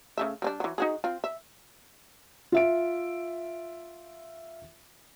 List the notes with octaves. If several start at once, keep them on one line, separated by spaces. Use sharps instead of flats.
C#3 A3 E5
G3 C4 D4
E3 F#3
D#4 F#4 G#4
C4 F4
E5
F4 E5 D7